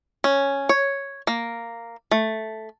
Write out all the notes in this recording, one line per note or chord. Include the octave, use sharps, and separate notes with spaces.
C#4
C#5
A#3
A3